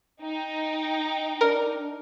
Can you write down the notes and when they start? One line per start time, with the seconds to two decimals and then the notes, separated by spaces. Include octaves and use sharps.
0.22 D#4 G5
1.41 D4 A#4